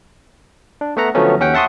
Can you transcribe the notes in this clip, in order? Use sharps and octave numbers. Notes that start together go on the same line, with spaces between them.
D4
A3 B3 E5 F#5 A#5
D3 F3 F#3 A3 B3 C#4
D#2 C#4 F#5 G5
E5 F#5 A5 C6 C#6 D#6